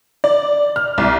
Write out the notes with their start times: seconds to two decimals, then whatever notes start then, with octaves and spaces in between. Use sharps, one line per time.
0.24 D5
0.76 F6
0.98 C2